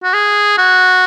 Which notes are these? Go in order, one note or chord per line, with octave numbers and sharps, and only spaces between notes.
F#4
G#4
F#4